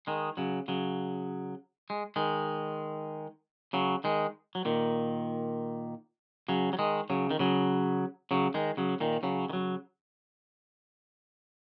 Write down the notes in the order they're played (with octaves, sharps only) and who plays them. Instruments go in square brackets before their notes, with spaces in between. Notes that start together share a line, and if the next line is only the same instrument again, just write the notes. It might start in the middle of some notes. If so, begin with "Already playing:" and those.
[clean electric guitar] D#3 G#3
C#3 F#3
C#3 F#3
G#3
D#3 G#3
C#3 F#3
D#3 G#3
F#3
A#2 D#3
C#3 F#3
F#3
D#3 G#3
C#3 F#3
D#3
C#3 F#3
C#3 F#3
D#3 G#3
C#3 F#3
A#2 D#3
C#3 F#3
D#3
C#3 F#3